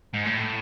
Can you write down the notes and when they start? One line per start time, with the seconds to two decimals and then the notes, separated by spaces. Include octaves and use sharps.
0.14 G#2
0.25 A2